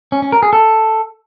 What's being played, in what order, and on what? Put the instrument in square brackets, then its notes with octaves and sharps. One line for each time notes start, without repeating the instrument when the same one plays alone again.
[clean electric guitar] C#4
C#4
A#4
G#4
A4